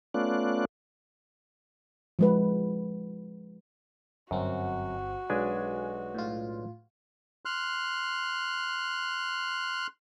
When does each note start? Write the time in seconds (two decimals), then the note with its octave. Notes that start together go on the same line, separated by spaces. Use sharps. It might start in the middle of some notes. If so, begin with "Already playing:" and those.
0.14 A3 B3 C#4 F4 D5 F#6
2.19 F3 G#3 B4
4.31 G1 F#2 C4 F#4
5.30 B1 G#3 D4 G#5
6.14 A2 F4
7.45 C6 F6 F#6